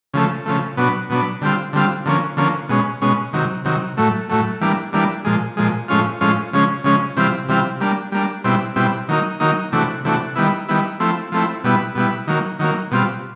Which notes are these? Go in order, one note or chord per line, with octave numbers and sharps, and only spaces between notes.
C#3 F3 A3
C#3 F3 A3
B2 F#3 B3 D4
B2 F#3 B3 D4
D3 G3 C4 F4
D3 G3 C4 F4
D3 F3 A#3 C#4
D3 F3 A#3 C#4
B2 G#3 C#4
B2 G#3 C#4
C3 D#3 F#3
C3 D#3 F#3
A2 F#3 A3
A2 F#3 A3
E3 G3 A#3 D4
E3 G3 A#3 D4
A#2 F3 G#3
A#2 F3 G#3
A2 F3 G#3 C#4 F4
A2 F3 G#3 C#4 F4
C#3 F3 G#3 C#4
C#3 F3 G#3 C#4
C3 E3 G3 C4 F4
C3 E3 G3 C4 F4
G3 A#3 D4
G3 A#3 D4
B2 G3 C4 E4
B2 G3 C4 E4
D#3 F#3 A#3 D#4
D#3 F#3 A#3 D#4
C3 E3 A3 D4 F#4
C3 E3 A3 D4 F#4
D#3 G3 B3 E4
D#3 G3 B3 E4
F3 A3 C4 E4
F3 A3 C4 E4
B2 G3 B3 E4
B2 G3 B3 E4
D#3 F#3 A#3
D#3 F#3 A#3
B2 G3 C4 F4